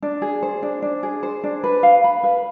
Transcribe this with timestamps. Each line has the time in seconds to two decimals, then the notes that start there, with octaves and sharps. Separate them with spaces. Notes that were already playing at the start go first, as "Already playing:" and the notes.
0.02 D4
0.22 G#4
0.43 C5
0.63 D4
0.82 D4
1.03 G#4
1.23 C5
1.44 D4
1.64 B4
1.83 F5
2.04 B5
2.23 B4